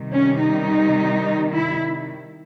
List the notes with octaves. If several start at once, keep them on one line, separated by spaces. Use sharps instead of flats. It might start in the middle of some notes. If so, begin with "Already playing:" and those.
Already playing: C3 D#3 G3
C#4
D#4
E4